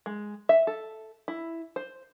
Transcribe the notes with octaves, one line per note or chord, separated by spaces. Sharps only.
G#3
E5
A4
E4
C5